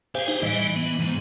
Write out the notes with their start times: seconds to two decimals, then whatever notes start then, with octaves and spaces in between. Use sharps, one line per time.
0.15 G4 G#4 C5 F5 G#5
0.28 D#4 C5
0.42 A2 E3 G3 D#5
0.76 B3
0.99 C#2 G#2 B3